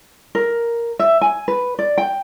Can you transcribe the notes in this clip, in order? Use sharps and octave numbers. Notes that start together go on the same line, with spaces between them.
A#4
E5
G#5
B4
D5
G5